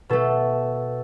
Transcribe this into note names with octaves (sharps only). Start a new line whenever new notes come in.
B2 A3 A4